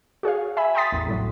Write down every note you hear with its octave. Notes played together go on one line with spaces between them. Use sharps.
F#4 G#4 C#5 F5
E5 G#5 B5
G5 A#5 C6 D#6 A6 B6
A1 E2
C2 A2 F#3